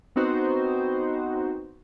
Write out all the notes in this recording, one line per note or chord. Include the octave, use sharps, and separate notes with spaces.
B3 C4 D#4 F#4 C5